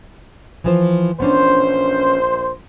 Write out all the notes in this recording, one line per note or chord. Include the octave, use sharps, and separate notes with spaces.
E3 F3 C5
A#1 B3 C#4 D4 C5